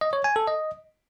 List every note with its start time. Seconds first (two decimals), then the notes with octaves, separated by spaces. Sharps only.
0.01 D#5
0.13 C#5
0.24 G#5
0.36 A4
0.47 D#5